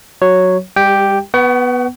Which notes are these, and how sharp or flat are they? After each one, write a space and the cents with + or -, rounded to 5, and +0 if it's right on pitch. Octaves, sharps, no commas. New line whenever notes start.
F#3 +0 C#5 +0
G3 +35 G4 +0 G5 +0
B3 +0 F#5 +40 C#6 +15